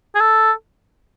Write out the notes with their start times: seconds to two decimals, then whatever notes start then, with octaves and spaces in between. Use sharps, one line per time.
0.15 G#4
0.20 A4